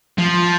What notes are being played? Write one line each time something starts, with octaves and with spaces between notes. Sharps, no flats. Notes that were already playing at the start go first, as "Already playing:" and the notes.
F3